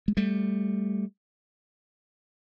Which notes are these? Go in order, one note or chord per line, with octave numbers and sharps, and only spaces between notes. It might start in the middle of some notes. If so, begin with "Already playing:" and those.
G#3
G3 A3